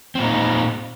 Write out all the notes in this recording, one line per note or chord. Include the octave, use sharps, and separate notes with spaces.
A#2 C4 D#4